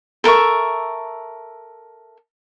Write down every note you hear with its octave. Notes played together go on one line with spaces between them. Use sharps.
A4 A#4 E5 C#6